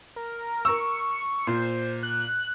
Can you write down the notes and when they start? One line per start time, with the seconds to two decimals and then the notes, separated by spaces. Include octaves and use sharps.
0.16 A#4
0.65 A#4 C#6 E6
1.47 A#2 C5
2.03 F#6